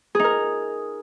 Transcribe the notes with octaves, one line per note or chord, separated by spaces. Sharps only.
D#4 G#4 A#4